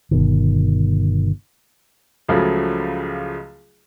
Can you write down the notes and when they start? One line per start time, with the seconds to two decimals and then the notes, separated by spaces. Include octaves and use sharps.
0.11 G1 B2 D#3
2.28 C#2 C#3 F3 F#3 A3